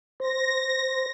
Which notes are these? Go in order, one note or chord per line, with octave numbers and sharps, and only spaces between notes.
C5 A#6